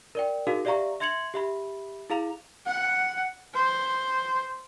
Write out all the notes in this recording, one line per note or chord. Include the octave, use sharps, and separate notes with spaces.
A#4 D5 G5
D#4 F#4 G#4 A#4 F5
G4 D5 E5 F5 A#5 C#6
E5 C6 G#6 C#7 F7 F#7
G4 E5 B5
E4 G#4 F5 A#5 F7
F#5
C5